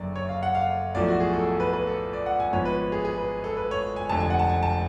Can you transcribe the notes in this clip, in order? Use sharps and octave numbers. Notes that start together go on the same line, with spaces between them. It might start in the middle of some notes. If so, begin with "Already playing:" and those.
Already playing: F#1 F#2 D3 D5
C#5
F5
F#5
F5
B1 A2 F3 A3 D5
F#4
G#4
A4
A4
B4
B4
A4
D5
F#5
G#5
G#1 G#2 F3 B3 C#5
B4
G#4
G#4
B4
A4
B4
C#5
G#5
F1 F2 D3 A5
G#5
F#5
A5
G#5
A5